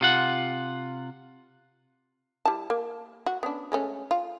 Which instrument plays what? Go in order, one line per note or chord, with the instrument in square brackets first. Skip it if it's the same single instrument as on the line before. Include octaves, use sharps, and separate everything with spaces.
[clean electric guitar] C3 F4 F#5
[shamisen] G3 E4 A5
A#3
F#4
B3 C#4 D4
G#3 A3 C#4
F4